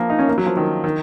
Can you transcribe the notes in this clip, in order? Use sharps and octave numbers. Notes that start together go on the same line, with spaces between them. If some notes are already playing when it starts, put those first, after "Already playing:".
Already playing: F3 A#3
D#4
C#4
A#3
F#3
F3
D#3
D#3